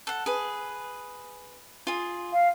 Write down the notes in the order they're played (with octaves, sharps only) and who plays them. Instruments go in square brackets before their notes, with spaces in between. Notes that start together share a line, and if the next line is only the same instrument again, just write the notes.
[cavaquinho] A4 F#5
G#4 B4
F4 G#4
[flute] F5